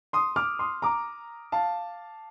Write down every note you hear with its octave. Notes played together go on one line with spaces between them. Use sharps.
C6 D#6
D6 F6
C6 D#6
A#5 D6
F5 A5